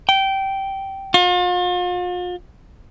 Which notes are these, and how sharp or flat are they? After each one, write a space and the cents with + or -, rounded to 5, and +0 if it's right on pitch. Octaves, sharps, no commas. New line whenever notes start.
G5 -15
F4 +40